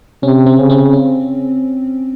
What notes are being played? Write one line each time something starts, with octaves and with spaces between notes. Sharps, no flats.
C3 C#4
C4
C#3
C4
C#4